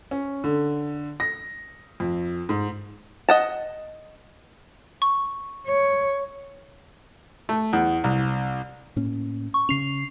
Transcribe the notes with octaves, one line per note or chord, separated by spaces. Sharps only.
C#4
D3
A#6
F2
G#2
D#5 F#5 A5
C#6
C#5
A3
E2
C2
A2 A#3 C#4
C#6
C#3 C#4 C7 F7